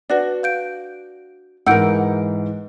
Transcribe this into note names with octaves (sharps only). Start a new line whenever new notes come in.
D4 F#4 B4 D5
F5 G6 D7
G#2 E3 A#4 F#5 E6 G6 D7